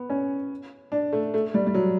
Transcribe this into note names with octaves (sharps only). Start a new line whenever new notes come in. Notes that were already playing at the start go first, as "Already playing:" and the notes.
Already playing: B3
C#4
D4
A3
A3
G3
G3
F#3